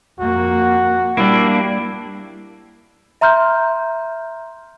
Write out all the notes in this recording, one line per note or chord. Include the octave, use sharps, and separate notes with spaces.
F2 A#3 F#4
G3 A#3 D4 E4
E5 A#5 C6 F6 G6